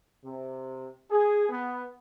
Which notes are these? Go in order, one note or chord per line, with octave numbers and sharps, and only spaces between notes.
C3
G#4
B3